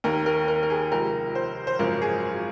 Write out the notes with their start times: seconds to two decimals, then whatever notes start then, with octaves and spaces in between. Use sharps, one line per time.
0.04 D#2 D#3 A#4
0.26 A#4
0.48 A#4
0.63 A#4
0.70 G#4
0.92 C#2 C3 F3 A#4
1.35 C5
1.67 C5
1.79 G#1 F#2 C#3 F3 A#4
2.02 G#4